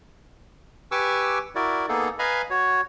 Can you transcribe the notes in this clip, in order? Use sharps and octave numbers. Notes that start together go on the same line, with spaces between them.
G4 B4 G#5 C#6 D6 E6
E4 F#4 A#4 D5
A#3 B3 D#4 G#4 A4
B4 D#5 F5 G#5 A#5 B5
F#4 C#5